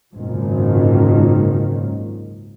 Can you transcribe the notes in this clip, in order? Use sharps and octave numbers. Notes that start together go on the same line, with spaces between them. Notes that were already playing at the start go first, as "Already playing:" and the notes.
G#1 C#2 F#2 A#2 D#3